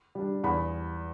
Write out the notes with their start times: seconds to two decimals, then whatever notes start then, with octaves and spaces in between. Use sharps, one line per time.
0.15 G3 D4
0.43 E2 B5